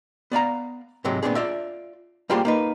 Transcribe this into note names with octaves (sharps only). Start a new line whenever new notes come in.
B3 D5 F5 A#5
G#2 C3 F#3 G#3
A#2 E3 B3 C4 D4 G#4
F4 D5 E5
G3 A#3 F4 G4 G#4 C5
A#3 D#4 B4